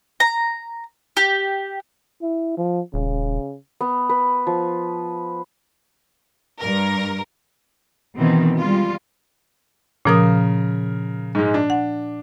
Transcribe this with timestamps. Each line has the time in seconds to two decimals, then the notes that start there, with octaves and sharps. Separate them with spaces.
0.20 A#5
1.17 G4
2.22 E4
2.57 F3
2.94 D#1 C#3
3.81 B3
4.09 B4
4.47 F3
6.59 G2 A#4
8.17 B2 D#3 E3 C4
8.58 G3 G#3 F4
10.05 A#2 C#3 F3 A#4 D#6
11.35 G#2 G#3
11.54 D4
11.70 F#5